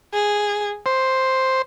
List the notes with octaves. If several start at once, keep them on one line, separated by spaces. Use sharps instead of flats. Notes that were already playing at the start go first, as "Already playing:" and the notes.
G#4
C5